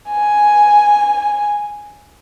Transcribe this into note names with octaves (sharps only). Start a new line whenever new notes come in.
G#5